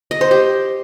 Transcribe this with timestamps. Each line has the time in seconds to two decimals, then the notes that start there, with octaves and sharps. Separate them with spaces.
0.11 D#5
0.21 C5
0.31 G4